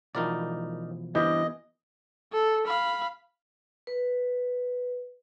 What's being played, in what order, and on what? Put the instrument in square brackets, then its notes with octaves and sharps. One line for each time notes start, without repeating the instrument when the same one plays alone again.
[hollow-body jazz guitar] B2 E3 F3 [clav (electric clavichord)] D#4 A#4 D5
[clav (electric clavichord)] G2 C3 [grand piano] E3 D6 G6 [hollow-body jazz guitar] B3 [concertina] D#5
[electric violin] A4
F5 B5
[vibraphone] B4